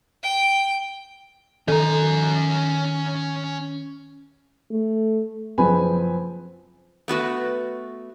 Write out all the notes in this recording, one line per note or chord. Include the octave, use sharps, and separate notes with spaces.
G5
D#3 C#4 A4 D#5 A#5
A3
F#1 F3 C4 B4 G#5 B5
A3 B3 F#4 B4